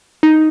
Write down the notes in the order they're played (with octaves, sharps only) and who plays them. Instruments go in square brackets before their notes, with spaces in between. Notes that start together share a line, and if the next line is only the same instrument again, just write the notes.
[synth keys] D#4